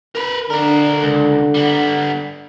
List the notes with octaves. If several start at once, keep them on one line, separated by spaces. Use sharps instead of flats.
A#4 B4
D3 D4 A#4
C#2
G3 B3